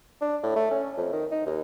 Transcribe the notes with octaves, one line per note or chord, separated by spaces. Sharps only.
D4
A2
A3
C#4
F2
D#3
D#4
D#2